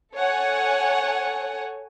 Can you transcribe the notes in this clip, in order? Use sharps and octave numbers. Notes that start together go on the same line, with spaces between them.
A4 C#5 F#5 G#5